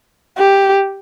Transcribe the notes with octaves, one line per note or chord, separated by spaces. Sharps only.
G4